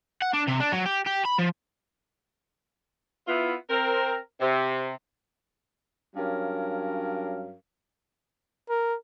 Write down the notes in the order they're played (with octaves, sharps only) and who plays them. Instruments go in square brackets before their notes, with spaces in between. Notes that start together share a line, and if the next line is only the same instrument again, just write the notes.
[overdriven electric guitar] F#5
D4
C3
D4
F#3
G4
G4
B5
F3
[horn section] B3 E4 F4
C4 A#4
C3
G2 F#3 C#4 A#4 F5
[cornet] A#4